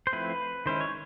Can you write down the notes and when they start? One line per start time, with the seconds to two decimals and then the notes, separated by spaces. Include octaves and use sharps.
0.07 C5
0.13 F3 A3 C4 E4 B4
0.66 D#3 G#3 C#4 E4 C5
0.81 C#5